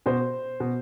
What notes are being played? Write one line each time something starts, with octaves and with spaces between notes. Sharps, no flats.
B2 C5
B2